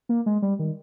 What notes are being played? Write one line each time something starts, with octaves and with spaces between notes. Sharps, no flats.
A#3
G#3
G3
D#3